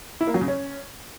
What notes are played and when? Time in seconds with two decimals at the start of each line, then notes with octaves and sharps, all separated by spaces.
0.21 E4
0.27 A#3
0.34 F#3
0.41 C#3
0.48 C#4